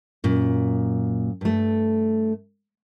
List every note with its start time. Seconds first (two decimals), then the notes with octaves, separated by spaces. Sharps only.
0.24 F#2 A#2
1.41 G2 A3